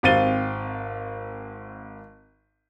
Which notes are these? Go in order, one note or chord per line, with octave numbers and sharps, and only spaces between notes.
G#1 C4 F5 A6 D#7 G7